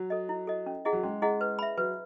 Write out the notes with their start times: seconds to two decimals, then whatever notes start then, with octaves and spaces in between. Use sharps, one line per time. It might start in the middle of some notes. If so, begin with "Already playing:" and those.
Already playing: F#3
0.10 A4 D#5
0.29 E4
0.47 A4 D#5
0.66 C#4
0.85 E4 G#4 D#5 F#5
0.93 F#3
1.03 G#3 C#4
1.22 E4 G#4 D#5 F#5
1.41 B4
1.59 E5 B5
1.77 F#3 B4